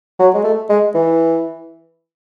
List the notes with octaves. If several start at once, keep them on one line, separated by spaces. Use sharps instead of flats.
F#3
G#3
A3
G#3
E3